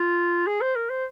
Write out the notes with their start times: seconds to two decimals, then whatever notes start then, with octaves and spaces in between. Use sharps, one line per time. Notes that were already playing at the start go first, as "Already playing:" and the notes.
Already playing: F4
0.47 G#4
0.61 C5
0.76 A#4
0.90 C5